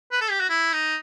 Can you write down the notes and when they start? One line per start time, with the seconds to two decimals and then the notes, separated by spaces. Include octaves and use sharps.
0.12 B4
0.21 A4
0.30 G4
0.41 F#4
0.50 E4
0.73 D#4